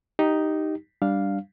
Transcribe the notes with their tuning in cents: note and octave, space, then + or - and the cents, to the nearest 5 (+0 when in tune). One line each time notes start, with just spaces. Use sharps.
D#4 +0 G4 -5
G3 +0 D4 -5 F5 +0